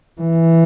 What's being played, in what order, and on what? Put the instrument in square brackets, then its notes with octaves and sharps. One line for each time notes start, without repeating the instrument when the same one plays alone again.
[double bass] E3